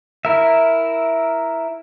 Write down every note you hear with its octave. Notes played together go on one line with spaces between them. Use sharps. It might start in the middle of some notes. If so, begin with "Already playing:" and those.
E4 A#4 E5